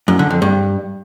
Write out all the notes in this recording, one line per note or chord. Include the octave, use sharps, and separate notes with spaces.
F#2
D3
F2
G2